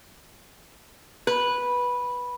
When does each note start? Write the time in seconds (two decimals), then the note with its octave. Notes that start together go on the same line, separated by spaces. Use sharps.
1.27 B4